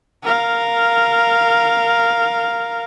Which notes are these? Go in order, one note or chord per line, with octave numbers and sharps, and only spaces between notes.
A#4 F5